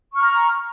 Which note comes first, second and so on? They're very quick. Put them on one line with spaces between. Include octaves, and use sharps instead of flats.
C#6 F6 A#5